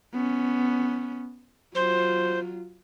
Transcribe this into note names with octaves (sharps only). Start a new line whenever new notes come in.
B3 C#4
F#3 F4 C5